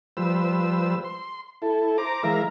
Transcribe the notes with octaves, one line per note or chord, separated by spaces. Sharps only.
F3 G3 B4 C5 E6
C6
E4 A4
C5 A#5 D6
E3 G#3 A#4 E5 F5 A#5